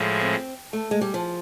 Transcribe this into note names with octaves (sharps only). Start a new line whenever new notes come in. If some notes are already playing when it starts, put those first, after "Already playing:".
Already playing: A2 F3 G#3
C4
A3
G#3
G3
F3